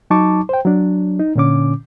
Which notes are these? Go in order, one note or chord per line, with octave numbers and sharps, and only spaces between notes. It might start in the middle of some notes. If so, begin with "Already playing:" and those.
F#3 D#4 A5 C#6 D6
C5 G5
F#3 D4
D#4
A#2 D3 C#4 D6